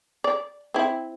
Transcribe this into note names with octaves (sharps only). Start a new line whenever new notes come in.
D5
C4 E4